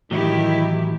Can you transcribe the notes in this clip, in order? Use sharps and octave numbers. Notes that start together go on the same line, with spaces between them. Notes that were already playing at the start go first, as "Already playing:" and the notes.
A2 D#3 E3 F#3 E4 G4